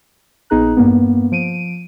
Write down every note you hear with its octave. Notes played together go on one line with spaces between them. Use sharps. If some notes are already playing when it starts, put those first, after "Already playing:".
A#1 B3 D#4 G#4 A#5 F#6
G2 A#3 B3
F3 D7 D#7